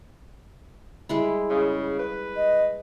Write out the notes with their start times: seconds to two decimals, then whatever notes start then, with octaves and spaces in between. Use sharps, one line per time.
1.09 G3 G#3 E4
1.50 C#3
1.99 B4
2.36 D#5